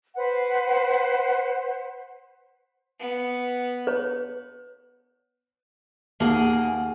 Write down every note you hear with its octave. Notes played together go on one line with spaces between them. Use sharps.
B4 C5 F#5
B3
B4 C#5
D#2 A#3 G#4 F#5 A5